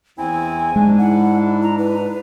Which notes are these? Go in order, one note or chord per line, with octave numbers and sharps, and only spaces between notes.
E2 C4 E4 G#5
G#2 G#3 D4
E4 F#5
A#5
B4